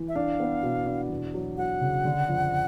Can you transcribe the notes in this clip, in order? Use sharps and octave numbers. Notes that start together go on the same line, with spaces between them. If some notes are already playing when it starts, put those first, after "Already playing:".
Already playing: E3
E5
D4 F5
B3
B2
D4
E2
F#3
F#3 F#5
C#3
D3
F2